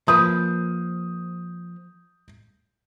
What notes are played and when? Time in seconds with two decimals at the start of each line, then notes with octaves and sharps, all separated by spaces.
0.08 F3 A#3 B4 D#6 G6